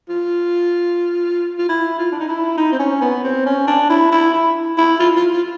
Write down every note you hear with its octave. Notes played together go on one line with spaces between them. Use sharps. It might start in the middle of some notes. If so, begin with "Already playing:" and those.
F4
F4
E4
F4
D4
D#4
E4
D#4
C4
C#4
B3
C4
C#4
D4
E4
E4
E4
E4
F4
F4
F4